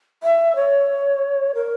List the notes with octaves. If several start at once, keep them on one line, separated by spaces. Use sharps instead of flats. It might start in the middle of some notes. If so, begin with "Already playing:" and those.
E5
C#5
A#4